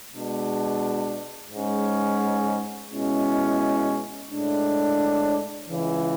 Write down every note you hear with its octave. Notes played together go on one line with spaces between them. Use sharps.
B2 G#3 D4
G#2 G#3 C#4
B2 G#3 C#4 E4
A2 G#3 D4
C#2 C#3 E3